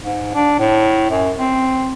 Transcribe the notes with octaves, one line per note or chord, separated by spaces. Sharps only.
G#2
D4
A2
F#2
C4